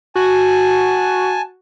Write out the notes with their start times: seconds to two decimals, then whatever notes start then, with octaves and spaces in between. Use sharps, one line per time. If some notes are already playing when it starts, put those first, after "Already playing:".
0.15 F#4 G#5 A5